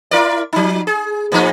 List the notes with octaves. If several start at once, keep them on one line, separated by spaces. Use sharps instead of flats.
E4 A#4 D5
F3 D#4
G#4
A2 F3 D#4